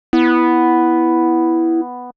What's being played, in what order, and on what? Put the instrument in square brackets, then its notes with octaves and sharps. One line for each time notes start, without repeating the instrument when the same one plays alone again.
[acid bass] B3 [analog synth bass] E4